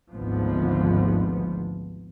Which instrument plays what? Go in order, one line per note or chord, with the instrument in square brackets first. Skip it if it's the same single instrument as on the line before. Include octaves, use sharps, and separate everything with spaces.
[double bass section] G#1 D2 G#2 F3 B3